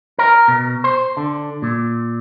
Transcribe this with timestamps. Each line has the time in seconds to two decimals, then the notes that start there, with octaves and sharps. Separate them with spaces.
0.18 A#4
0.48 B2
0.84 C5
1.17 D3
1.62 A#2